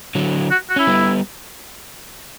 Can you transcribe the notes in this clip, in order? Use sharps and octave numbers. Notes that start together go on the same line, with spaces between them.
D3 F#3
F#4
F#4
C#4 E4
G3 B3